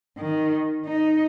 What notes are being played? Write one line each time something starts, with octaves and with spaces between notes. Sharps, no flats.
D#3
D#4